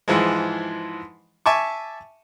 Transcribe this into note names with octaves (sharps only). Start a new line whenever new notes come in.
G#2 E3 F3 G#3
E5 G#5 A5 C#6 D6